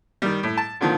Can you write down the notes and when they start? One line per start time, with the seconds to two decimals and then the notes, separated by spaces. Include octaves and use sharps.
0.22 D#3 G3
0.43 A2
0.57 A5
0.81 A#2 D3 D#3 F3